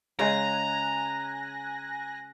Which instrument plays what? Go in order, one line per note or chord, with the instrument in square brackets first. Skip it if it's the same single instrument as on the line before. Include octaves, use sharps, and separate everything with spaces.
[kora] C#3 G#3 [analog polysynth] G#5 F#6 A#6 [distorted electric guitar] A#5